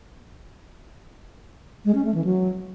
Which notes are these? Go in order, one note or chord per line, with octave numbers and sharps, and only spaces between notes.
G#3
C#4
A3
E3
F#3